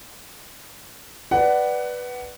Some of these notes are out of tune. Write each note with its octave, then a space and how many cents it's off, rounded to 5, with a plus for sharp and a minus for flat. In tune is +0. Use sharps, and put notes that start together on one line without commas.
B4 +0 D5 +10 F#5 +20